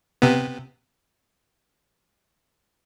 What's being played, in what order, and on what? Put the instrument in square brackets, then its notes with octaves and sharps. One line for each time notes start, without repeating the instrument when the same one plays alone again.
[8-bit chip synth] C3 B3